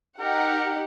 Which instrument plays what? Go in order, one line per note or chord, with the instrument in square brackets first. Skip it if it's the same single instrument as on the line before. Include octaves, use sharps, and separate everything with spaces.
[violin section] D#4 G4 F#5 [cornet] A#4